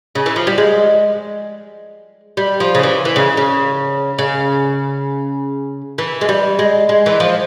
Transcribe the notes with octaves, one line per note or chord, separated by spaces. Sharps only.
C#3
E3
F3
G3
G#3
G3
F3
C#3
E3
E3
C#3
C#3
C#3
E3
G#3
G3
G#3
G#3
E3
F3